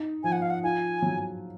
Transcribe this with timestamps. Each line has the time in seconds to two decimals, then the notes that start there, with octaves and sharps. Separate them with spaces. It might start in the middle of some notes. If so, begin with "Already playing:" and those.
Already playing: D#4
0.24 F3 G#5
0.32 F#5
0.42 F5
0.50 F#5
0.63 F4 G#5
1.02 F#3